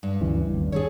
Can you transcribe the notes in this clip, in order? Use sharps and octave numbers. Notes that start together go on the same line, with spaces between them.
G2
D2 C#3 E3
G#1 D#2
G2 G#4 A4 C#5